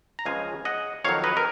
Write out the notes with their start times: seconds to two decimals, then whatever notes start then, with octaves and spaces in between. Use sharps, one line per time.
0.19 A#5
0.26 C#2 C#3 F3 G#3 F5 G#5
0.65 D#5 F#5
1.04 F2 D#3 F#3 C#5 F5
1.24 B4 D#5
1.37 A#4